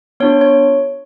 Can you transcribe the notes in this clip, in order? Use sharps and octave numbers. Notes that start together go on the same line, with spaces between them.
B3 D4 F4 C#5
C#5